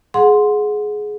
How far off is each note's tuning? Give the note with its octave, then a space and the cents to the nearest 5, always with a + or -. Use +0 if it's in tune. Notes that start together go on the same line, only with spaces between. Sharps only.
G#4 +15 F#5 -25 C6 +0